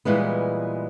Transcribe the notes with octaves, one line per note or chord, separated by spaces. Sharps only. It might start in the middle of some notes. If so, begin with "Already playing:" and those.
A#2 E3 G3 G#3 B3